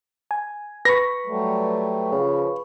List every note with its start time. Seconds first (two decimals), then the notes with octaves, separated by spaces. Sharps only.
0.31 G#5
0.85 B4 B5 C#6 A#6
1.26 F#3 G3 A3
2.12 C#3 F3